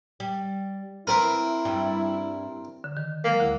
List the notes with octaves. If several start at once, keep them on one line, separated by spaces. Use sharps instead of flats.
G3
C4 E4 A#4 B4
G2 G3
D3
D#3
F#3 G#3 A#3
D2 D3 E4